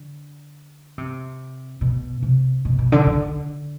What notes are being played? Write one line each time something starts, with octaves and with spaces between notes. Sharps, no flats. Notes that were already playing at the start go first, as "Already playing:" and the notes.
Already playing: D3
C3
B2
C3
B2
B2
D3
D3